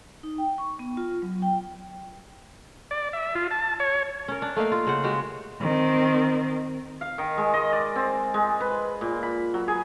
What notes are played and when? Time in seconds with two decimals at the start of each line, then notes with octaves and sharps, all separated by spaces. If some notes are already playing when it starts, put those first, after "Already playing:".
0.23 D#4
0.38 G5
0.58 C#6
0.79 B3
0.97 F4
1.22 F#3
1.42 G5
2.91 D5
3.13 E5
3.35 F4
3.51 A5
3.80 C#5
4.28 C#4 A#4
4.42 D4
4.56 A3 A#3 D#4 F5
4.72 F4
4.87 C#3 C5 F#5
5.04 G#3 F#4 G4
5.61 D#3 C4
7.01 F5
7.18 D#3
7.37 G#3
7.54 D#5
7.73 D5
7.96 C4
8.34 G#3
8.60 B4
9.01 A#2
9.23 B5
9.54 F#3
9.68 G#4